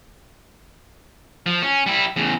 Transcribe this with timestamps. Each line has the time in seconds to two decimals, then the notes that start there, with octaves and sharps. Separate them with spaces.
1.46 F3
1.62 C#4
1.86 G3 E4
2.16 E2 C#3